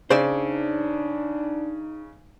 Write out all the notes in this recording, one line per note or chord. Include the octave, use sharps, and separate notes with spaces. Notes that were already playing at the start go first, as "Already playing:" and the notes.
C#3 D4 D#4 C5 D5 E5